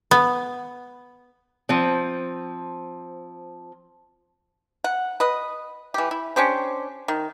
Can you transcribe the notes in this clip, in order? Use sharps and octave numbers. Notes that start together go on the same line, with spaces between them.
B3
F3 C4
F#5
B4 D#5
E3 G4
E4
C#4 D4 G4 C5
D#3